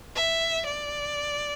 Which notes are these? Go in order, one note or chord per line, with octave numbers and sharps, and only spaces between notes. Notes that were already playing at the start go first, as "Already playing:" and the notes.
E5
D5